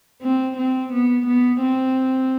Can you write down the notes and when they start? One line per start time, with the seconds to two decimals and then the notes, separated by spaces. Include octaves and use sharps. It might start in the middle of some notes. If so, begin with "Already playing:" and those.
0.22 C4
0.57 C4
0.93 B3
1.27 B3
1.63 C4